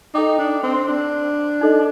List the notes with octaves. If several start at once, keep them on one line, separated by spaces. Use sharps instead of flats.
D#4 A4 D#5 G5 D6
D4
C4
D4
D#4 A4 D#5